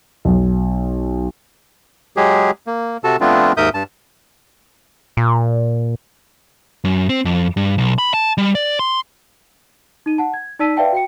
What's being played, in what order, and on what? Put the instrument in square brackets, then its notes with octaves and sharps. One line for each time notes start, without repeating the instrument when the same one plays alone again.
[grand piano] B1
[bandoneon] F#3 G#3 G4 G#4
A#3
C3 F#4 A4 A5
F3 A3 B3 C4 D4 F4
D#2 G#2 A#4 E5 D#6 G6
G2 A5
[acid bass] A#2
[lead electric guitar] F#2
C4
F2
G2
B1
B5
A5
G3
D5
C6
[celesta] D#4 D#7
F#5 A5
G#6
D#4 D5 A5 E6 B6 D#7
B4 D5 E5 F5 G5 A5
F#4 G5 C#7